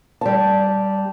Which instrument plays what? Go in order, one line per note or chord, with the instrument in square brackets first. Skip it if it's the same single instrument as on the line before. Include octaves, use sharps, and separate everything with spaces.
[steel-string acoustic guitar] G3 A5